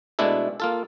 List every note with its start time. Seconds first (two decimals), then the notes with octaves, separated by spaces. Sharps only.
0.19 B2 G#3 A3 D4 E4 A4
0.60 A#3 F4 A4